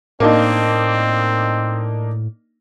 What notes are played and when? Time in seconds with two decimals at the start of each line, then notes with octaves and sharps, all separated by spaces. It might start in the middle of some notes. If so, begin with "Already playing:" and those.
0.20 A2 A#3 C4 D4 D#4